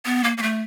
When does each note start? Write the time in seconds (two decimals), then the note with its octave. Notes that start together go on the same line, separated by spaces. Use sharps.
0.05 B3
0.24 A#3
0.38 A#3
0.43 A3